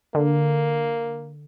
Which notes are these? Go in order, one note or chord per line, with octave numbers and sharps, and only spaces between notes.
D3 A#3